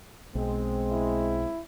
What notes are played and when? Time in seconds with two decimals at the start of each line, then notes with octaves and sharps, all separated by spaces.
0.35 B1 G#3 C4
0.92 E4